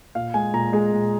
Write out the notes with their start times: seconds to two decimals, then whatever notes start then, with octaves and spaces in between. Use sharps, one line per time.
0.15 A#2 F5
0.34 G#3 G#5
0.54 A#2 A#5
0.73 G#3 G#4
0.92 A#2